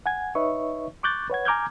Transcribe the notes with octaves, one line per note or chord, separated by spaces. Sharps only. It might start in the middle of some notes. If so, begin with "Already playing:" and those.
F#5 G#5 G#6
D#4 B4 C#5 D#5 E5 C#6
C#6 D6 F#6 G6 A6
B4 C#5 F#5 G#6
G#5 A#5 D6 F6 G6 G#6